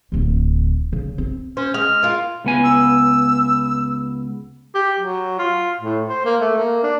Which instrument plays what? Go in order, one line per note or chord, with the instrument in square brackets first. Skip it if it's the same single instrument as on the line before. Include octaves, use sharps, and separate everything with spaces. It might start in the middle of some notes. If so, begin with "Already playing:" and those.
[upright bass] D1 D2
C#3
C4
[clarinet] C#4 [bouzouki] C5
[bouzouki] G#3 [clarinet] F6
[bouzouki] F4 A#4
[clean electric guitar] C#2 B3 G#5
[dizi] E6
[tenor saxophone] G4
F#3
F4
A2
C5
A#3
A3
A#3
D4